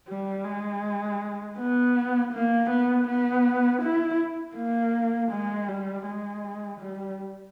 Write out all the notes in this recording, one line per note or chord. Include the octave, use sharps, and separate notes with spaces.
G3
G#3
B3
A#3
B3
B3
E4
A#3
G#3
G3
G#3
G3